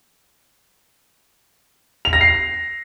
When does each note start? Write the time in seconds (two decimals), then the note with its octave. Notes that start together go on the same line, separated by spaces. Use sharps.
2.05 F7
2.13 A#6
2.21 C7